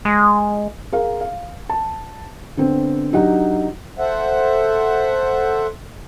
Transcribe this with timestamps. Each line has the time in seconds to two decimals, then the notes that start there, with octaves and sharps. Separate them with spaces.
0.05 G#3
0.92 G#4 A#4 F5
1.21 F5
1.70 A5
2.57 D3 B3 C4
3.13 F#3 D4 D#4 F#4 G4 F#5
3.99 A4 C5 E5 F#5